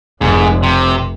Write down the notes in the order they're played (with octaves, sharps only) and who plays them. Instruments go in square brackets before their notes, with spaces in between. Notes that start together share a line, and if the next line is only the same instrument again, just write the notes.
[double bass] F1 [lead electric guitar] G#2
[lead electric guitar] C3